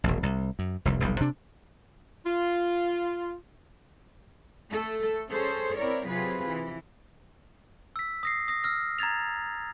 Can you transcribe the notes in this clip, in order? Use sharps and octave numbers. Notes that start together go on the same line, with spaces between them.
E1 A#1
C2
F#2
F1 C2
F1 B1 G3
C3 D4
F4
A3 A4
C#4 G#4 A4 C5 C#5
C4 E4 A#4 C#5 D5
C3 F#3 F4 G#4 B4
E3
E6 B6
D#6 A#6 C7
D#6 A#6
E6 F6 A#6
A#5 G#6 A6 F7